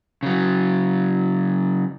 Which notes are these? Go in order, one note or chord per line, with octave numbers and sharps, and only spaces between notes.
C#3 F#3